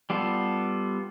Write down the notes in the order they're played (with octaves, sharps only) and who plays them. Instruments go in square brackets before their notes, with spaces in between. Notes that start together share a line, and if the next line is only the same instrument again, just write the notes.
[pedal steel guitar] G3 B3 F4 A4